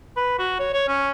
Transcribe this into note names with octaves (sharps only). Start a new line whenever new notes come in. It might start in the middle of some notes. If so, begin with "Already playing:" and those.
B4
F#4
C#5
C#5
C#4